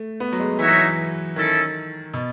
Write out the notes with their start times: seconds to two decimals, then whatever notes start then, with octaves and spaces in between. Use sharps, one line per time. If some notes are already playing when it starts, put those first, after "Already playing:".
Already playing: A3
0.20 B3
0.33 F#3
0.40 G#3
0.59 E3 D#4 F#4 C#5 E5
0.69 F#3
0.78 E3
1.36 D#3 C#4 E4 A4
2.14 B2